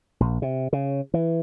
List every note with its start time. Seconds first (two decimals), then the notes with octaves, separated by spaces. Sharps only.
0.20 A#1
0.42 C3
0.73 C#3
1.14 E3